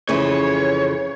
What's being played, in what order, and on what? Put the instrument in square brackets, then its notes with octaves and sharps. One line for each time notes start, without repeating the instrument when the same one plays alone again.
[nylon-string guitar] F2 C#3 E3 [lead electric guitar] C#5